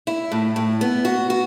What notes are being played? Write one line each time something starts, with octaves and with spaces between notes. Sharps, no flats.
E4
A2
A2
B3
F#4
F#4